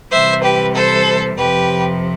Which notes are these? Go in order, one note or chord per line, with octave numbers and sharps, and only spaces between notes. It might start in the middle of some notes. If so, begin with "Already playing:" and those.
C3 E3 G3 C5 E5
G4 B4
A4 C5
F2 C3 F3 G4 B4